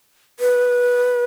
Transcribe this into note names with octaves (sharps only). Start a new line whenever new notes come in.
B4